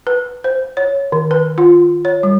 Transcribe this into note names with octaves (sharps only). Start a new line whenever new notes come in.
B4
C5
C#5
D#3
B4
F4
C#5
G3